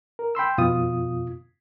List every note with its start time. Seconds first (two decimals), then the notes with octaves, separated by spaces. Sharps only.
0.19 A#4
0.35 G5 B5 C6 E6
0.58 F2 B2 F4 D#6